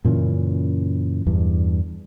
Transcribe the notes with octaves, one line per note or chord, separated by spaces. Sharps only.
F#2 A#2 C#3 E3
E2 G2